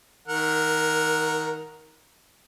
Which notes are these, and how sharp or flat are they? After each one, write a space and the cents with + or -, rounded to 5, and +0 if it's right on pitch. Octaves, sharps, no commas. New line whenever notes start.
D#3 +25 A#4 +0 F#5 -15